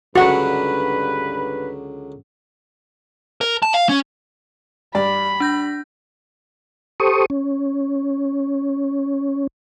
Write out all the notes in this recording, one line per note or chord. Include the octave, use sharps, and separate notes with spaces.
C#2 G2 D3 F#3 F#4 B4 F#5
A#4
A5
F5
C#4
G2 D5 B5
D4 G6 A#6
G4 A4 C5 C#6 D#6
C#4